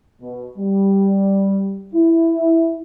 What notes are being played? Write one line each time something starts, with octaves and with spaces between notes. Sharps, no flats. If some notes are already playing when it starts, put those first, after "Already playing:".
B2
G3
E4